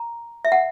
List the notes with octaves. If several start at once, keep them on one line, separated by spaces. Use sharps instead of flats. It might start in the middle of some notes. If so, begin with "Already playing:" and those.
Already playing: A#5
E5
F#5